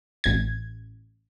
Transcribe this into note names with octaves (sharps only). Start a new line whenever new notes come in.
A1 G#6